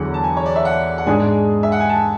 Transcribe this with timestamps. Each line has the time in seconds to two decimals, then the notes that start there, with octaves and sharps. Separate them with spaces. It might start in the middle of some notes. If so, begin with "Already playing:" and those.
Already playing: E2 D3 F#3 F#5
0.14 A5
0.24 G#5
0.37 C#5
0.46 D5
0.56 E5
0.65 F#5
0.98 F#5
1.07 G#2 G#3 D4 G#4 G#5
1.63 E5
1.72 F#5
1.80 G#5
1.89 A5